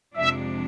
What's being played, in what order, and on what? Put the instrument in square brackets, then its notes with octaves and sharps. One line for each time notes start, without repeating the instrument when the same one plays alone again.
[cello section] F2 C3 F3 G#3 D4 [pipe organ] E5